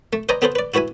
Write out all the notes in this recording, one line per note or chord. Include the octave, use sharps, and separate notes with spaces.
A3
B4 C5 D5 D#5 G#5 A#5
B3 G#4 A4 B4 C5
B4 D5
E4 F#4 B4 E5 G#5